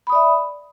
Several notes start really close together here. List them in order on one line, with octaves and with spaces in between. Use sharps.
B5 D#6 D5 E5